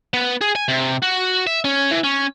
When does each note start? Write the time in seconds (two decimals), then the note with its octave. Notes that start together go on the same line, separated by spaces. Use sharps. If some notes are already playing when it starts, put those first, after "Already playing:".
0.14 B3
0.41 G#4
0.55 G#5
0.68 C3
1.03 F#4
1.47 E5
1.64 C#4
1.91 E3
2.04 C#4